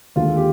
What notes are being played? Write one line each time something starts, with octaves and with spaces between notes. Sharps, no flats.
D#2 D3 G#3 F4
G4